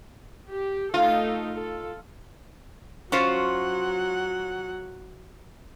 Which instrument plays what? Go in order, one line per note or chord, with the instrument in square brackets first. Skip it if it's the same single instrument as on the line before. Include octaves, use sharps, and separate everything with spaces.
[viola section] G4
[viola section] A3 D#4 A4 [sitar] F4
[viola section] A4
[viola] F#3 F#5 [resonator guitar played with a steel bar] C#4 F4 C5